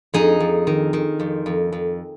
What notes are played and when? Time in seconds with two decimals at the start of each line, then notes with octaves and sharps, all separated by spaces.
0.14 F2 D#4 G#4
0.40 F2
0.67 D#3
0.93 D#3
1.20 F2
1.46 F2
1.72 F2